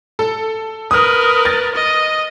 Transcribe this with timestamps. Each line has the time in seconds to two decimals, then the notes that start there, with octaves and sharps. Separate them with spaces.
0.19 A4
0.91 A#4 B4 D#6 F6
1.45 A6
1.75 D#5